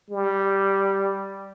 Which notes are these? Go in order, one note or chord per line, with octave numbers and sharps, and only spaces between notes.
G3